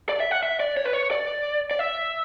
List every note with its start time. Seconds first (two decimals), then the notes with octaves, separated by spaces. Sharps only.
0.09 D5
0.20 E5
0.31 F#5
0.43 E5
0.60 D5
0.77 C#5
0.85 B4
0.93 C#5
1.11 D5
1.71 D5
1.79 E5